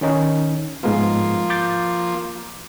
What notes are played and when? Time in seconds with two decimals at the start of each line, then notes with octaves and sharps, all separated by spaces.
0.01 D#3 C#4 D#4
0.83 G#2 F3 G#3 A#3 B3 F4
1.50 D6 G6 A6